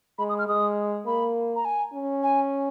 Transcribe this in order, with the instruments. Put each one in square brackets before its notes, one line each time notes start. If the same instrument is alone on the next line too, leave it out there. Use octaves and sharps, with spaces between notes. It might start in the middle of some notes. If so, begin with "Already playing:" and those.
[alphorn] G#3 [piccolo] B5
[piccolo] D#6
F6
[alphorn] G#3 [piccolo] D#6
[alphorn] A#3 [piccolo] B5
[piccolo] A#5
G#5
[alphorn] C#4
[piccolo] G#5